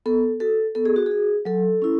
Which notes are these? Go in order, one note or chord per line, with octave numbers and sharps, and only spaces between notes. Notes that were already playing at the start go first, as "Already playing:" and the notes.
B3 A4
F#4 A4
B3 A4
G#4
F#4
F#4 G#4
F#3 A4
C#4 E4